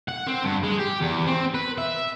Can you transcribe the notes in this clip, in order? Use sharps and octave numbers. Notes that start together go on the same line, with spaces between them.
F#5
C4
G2
G#3
G4
E2
C4
B4
E5